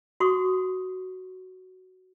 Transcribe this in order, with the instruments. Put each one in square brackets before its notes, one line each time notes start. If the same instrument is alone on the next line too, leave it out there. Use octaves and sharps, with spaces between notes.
[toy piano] F#4 C6 C#6 D#6